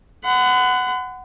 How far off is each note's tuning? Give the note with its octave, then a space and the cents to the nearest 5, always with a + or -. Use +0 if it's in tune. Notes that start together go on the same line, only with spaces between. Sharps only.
F#5 +5 B5 +45